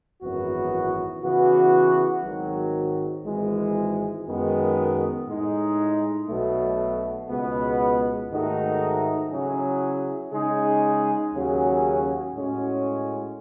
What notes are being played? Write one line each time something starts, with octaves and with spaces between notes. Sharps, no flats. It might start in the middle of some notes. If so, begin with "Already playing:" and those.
G#1 F#2 E3 B3 F#4
C#3 E3 B3 F#4
G#1 G#2 D#3 F#3
G#1 G#2 E3 G#3
F#2 D#3 G#3 B3
A2 G#3 D#4
B1 B2 F#3 A3
C#2 B2 G#3 B3
G#2 D#3 A3 D#4 F#4
C#3 F#3 C#4 E4 G#4
C#3 G#3 D#4 G#4
D#2 C#3 F#3 C#4 G#4
A2 G#3 C#4 F#4